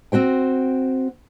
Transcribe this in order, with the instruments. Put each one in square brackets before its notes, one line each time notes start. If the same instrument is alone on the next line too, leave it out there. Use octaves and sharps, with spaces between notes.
[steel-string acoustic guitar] C4 F#4 C5 G5